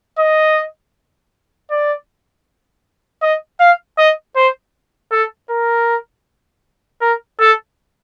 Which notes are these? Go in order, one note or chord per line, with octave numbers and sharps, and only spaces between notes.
D#5
D5
D#5
F5
D#5
C5
A4
A#4
A#4
A4